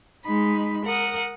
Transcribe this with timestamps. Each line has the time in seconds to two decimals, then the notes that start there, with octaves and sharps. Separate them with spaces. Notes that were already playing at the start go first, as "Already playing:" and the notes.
0.24 G#3 D#4 B5
0.84 A#4 F#5 D#6